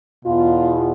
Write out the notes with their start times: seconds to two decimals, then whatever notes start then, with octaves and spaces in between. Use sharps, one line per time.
0.25 E2 B2 F4